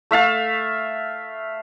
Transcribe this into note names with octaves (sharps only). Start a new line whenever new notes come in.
A3 E5 F5 A5